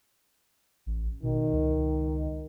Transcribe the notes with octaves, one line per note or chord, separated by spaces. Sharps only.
A1
B2 D#3
C#2